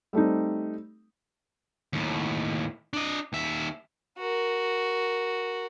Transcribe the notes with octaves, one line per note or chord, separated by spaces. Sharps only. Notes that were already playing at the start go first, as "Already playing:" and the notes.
G3 A3 C4 D#4
D#2 A2
D4 D#5
D#2 E5
F#4 A#4